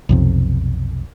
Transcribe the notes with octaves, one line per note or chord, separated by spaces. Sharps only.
B1 F2 C3